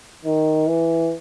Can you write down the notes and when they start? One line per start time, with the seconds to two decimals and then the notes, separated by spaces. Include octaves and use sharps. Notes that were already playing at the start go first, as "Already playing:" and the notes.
0.25 D#3
0.68 E3